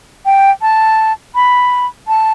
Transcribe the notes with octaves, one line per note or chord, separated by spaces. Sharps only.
G5
A5
B5
A5